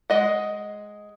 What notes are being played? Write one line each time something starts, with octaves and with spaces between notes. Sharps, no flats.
G#3 D#5 F#5